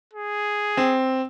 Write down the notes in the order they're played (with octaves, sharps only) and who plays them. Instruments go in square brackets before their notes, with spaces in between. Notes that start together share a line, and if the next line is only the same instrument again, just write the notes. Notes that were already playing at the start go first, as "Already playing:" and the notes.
[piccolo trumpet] G#4
[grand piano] C4